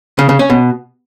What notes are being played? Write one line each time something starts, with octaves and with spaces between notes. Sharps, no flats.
C#3
C#3
C#4
B2